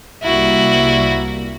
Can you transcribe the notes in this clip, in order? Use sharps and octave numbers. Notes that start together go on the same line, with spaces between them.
C2 G3 A#3 E4 F#4